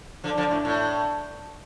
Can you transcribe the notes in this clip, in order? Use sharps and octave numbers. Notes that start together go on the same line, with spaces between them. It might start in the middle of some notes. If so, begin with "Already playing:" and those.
D3 F3
D3 F3
A2
A2